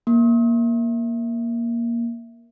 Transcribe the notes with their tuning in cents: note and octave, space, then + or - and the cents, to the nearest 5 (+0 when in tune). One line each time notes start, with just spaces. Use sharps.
A#3 +10